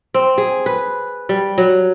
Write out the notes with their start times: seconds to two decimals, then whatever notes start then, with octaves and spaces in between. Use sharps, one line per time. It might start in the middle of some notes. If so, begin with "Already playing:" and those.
0.14 C4
0.38 G#4
0.66 B4
1.29 G3
1.58 F#3